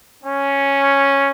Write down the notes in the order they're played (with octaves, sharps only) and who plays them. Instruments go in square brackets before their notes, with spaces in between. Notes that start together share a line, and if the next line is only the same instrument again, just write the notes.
[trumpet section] C#4